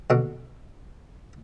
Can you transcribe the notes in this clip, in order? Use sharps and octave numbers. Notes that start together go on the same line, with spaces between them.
B2 D3